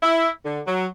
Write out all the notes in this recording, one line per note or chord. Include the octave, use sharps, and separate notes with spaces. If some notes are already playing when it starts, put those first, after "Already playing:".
E4
D3
F#3